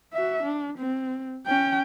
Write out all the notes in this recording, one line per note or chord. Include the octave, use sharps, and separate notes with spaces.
F#4 E5
D4
C4
C#4 G5